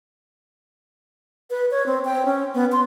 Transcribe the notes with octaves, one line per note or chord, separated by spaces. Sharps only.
B4
C#5
C4
G5
C#4
B3
C6